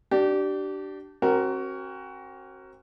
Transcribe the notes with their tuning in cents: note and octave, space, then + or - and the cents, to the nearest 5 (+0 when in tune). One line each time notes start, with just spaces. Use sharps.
D4 +5 G4 -30
C4 +40 F#4 +20 A#4 +0